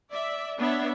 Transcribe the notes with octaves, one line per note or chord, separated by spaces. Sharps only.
D5 E5
B3 D4 C#5 E5